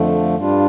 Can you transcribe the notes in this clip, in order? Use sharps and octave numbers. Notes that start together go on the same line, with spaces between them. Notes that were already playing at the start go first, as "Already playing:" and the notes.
Already playing: F2 D3 F3 A3
G2 G3 D4 F4